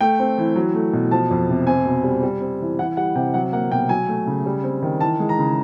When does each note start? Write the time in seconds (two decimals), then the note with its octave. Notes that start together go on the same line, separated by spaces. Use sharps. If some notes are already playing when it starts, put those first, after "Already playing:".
0.01 A3 G5
0.19 C4
0.38 E3
0.55 F#3
0.74 A3
0.93 B2
1.11 F3 A5
1.31 F2
1.49 C3
1.67 C4 G#5
1.85 B2
2.04 G3
2.23 G3
2.41 C4
2.60 E3
2.79 E3 F#5
2.97 G3 F#5
3.15 C3 G5
3.34 F#3 F#5
3.53 A#3 F#5
3.71 B2 G5
3.89 F#3 G#5
4.08 A3
4.27 C#3
4.46 G3
4.64 C4
4.82 D#3
5.01 E3 A5
5.20 G#3
5.29 A#5
5.39 C#3